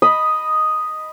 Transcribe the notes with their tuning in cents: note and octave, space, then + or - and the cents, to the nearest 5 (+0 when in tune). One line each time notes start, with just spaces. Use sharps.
D#5 +0 B5 +0